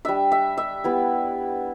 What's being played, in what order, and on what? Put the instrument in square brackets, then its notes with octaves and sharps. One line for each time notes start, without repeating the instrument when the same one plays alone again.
[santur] G3 D4 E5
E5
E5
G3 B3 E4